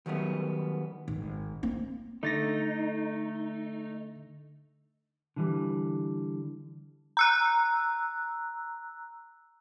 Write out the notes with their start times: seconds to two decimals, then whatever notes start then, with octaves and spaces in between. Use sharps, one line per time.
0.06 D#3 F#3 G3 A3 B3
1.08 G#1
1.63 A#3 C4
2.23 D3 A3 D#4 A6 A#6
5.36 D3 E3 G3
7.17 A#5 E6 F#6